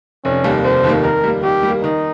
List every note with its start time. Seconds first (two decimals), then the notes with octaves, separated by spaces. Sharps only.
0.25 F1 C#4
0.44 D#2 D#3 G3 A#3
0.64 F1 C5
0.84 D#2 D#3 G3 A#3
1.03 D#3 A#4
1.24 G3 A#3
1.43 D#3 G4
1.63 G3
1.68 A#3
1.83 D#3 D#4